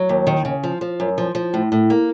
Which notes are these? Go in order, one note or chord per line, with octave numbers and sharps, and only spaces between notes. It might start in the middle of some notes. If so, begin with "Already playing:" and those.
Already playing: F#3
D#2
D#3
C#3
F3
F3
F#2
F3
F3
A2
A2
A#3